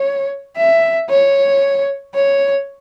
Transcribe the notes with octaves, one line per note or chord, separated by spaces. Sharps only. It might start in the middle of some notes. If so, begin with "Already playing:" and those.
Already playing: C#5
E5
C#5
C#5